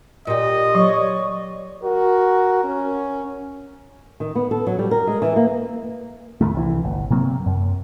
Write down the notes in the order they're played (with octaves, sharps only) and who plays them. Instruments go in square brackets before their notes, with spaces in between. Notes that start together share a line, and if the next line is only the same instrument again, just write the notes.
[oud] A#2 G4 [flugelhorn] D#5
[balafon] F#3 [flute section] C#5 D5 C#6
[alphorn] F#4 [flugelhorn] A#4
[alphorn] C#4
[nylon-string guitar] D#3
B3
A4
F#3
G3
A#4
G#3
E3
A#3
[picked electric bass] F2 B2 D#3 A3
C2 E3
G1
C3 F#3 A#3 C4
F#2